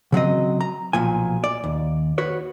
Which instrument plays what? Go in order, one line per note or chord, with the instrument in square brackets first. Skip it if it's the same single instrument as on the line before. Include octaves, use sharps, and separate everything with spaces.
[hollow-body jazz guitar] C#3 F#3 C4 D#5
A#5
B1 A#2 F3 G#5
D5
D#2
F#4 B4 C#5